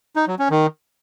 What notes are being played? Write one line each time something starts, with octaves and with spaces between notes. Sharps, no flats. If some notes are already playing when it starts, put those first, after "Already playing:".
D#4
F#3
C#4
D#3